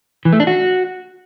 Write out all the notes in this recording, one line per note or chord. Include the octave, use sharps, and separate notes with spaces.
E3
A3
D4
F#4